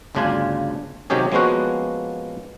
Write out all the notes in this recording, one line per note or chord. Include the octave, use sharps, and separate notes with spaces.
G1 D2 C#3 D4 F4 G#5
C3 D#3 F#3 C#4 G4 G#4
F3 G#3 A#3 B3 C#4 F#4